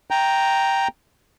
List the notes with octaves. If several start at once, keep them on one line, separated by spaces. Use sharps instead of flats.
G5 A#5